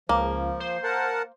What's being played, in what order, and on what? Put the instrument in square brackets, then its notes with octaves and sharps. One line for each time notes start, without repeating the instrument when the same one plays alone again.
[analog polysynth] C#2 [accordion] F3 [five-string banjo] A#3
[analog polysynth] C5
[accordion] A#4 F#5 A5